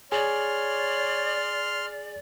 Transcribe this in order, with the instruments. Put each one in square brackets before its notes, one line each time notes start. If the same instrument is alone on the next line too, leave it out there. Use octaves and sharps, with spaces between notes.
[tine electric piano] G#4 G#5 [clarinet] C#5 [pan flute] D5 [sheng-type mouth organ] C6 F6